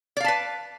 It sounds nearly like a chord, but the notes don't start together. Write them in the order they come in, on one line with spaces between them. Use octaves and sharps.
D5 F5 A5 B4